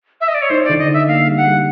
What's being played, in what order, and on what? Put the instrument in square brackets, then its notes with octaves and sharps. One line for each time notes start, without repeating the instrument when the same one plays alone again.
[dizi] E5
D#5
D5
C#5
[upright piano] D#4 [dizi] C5
[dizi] D5
[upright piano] D3
[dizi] D#5
[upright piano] D#4
[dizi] E5
[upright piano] A#3 [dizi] F5
[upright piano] G3
[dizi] F#5
[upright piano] G3